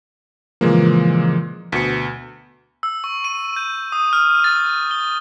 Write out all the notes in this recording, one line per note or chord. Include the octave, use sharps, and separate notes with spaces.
A#2 C#3 E3 F3 G#3 A#3
D2 B2 B6 C#7
E6
C#6
D#7
G6
D#6
F6
A6
G7